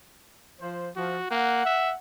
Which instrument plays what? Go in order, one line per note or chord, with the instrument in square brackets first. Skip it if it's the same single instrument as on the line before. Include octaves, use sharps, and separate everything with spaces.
[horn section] F3 C5
[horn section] F3 [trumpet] F#4
[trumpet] A#3 [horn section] F#5
[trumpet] E5